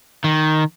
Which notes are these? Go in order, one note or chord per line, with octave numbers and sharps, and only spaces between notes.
D#3